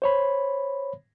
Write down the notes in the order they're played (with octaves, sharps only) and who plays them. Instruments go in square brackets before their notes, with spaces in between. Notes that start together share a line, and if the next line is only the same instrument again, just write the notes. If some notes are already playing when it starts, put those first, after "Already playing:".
[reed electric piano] C5 C#5 B5